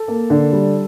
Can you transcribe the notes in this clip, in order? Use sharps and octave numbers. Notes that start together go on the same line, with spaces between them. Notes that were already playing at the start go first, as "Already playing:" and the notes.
Already playing: A4
A#3
D3
G3